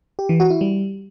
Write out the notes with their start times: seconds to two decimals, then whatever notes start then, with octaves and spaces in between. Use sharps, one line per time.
0.19 G4
0.29 E3
0.40 F#4
0.50 E4
0.61 G3